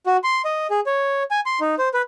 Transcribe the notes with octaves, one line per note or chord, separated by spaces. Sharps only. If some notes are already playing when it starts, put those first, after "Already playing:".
F#4
C6
D#5
G#4
C#5
G#5
C6
D#4
C5
B4